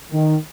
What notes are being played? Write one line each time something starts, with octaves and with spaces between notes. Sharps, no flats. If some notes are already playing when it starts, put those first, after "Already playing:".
D#3